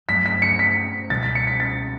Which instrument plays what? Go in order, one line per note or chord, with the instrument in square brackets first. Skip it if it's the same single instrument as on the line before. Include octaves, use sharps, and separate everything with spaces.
[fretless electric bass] G2 F#3 A3 [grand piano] B6
[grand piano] B6
C#7
B6
[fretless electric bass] C#2 B2 G3 [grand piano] A6
[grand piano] B6
C#7
B6
A6